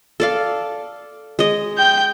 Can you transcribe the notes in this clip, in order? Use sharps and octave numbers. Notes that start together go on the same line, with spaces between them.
A4 D5 F5
G#3 D#5
G5 G6